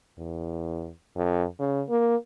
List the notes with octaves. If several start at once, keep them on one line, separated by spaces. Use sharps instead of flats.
E2
F2
C#3
A#3